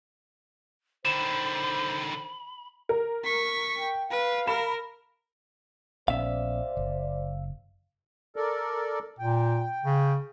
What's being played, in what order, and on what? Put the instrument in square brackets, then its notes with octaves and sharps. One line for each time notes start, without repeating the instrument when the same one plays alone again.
[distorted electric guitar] D3 D#3 [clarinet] C5 [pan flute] B5 [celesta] E7
[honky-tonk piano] A#4
[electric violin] C#6 B6
[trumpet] G5
[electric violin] B4 [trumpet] F5
[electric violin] A#4 [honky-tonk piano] B5 E7
[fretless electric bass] A#1 B3 C#4 [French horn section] C5 D5 [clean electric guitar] E5 F5
[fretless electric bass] F#1
[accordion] A4 A#4 D5
[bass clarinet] A#2 [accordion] G5
[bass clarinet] C#3